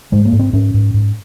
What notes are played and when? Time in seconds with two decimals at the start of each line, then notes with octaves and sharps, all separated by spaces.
0.12 G#2 G#3
0.25 A#3
0.32 G#2
0.39 C4
0.53 G#2 C#4
0.74 G#2
0.94 G#2